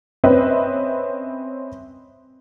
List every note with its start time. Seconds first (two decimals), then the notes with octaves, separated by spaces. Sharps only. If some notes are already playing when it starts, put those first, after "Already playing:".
0.24 C4 C#4 B4 C5 D#5 E5